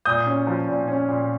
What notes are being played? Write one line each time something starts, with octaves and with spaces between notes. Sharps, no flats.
A#2 D#6 G6
C#4
F3
A#2
C#4
A#2